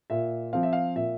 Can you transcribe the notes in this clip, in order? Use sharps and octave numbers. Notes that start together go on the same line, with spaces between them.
A#2 E5
F3 C4 F5
E5
F5
A#2 E5